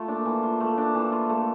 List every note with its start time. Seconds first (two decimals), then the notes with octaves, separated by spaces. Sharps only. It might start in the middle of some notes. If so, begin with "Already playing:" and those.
Already playing: A3 F4
0.08 A#3 D4
0.25 E3
0.43 F4
0.60 A3
0.78 D4
0.95 E3
1.12 F4
1.30 A3